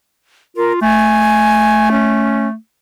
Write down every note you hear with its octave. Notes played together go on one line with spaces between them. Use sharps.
F4 A#4
A3 G#5
C#4